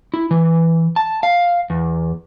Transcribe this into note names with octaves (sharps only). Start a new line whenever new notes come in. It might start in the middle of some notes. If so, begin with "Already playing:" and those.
E4
E3
A5
F5
E2